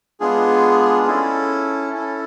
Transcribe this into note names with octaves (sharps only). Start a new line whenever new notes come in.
G#3 B3 D4 F4 G#4
C#4 E4 A4
C#4 E4 A4